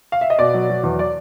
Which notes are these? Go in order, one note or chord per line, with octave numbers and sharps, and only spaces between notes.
F5
E5
D#5
B2 D5
F#3
F#3
E2
D5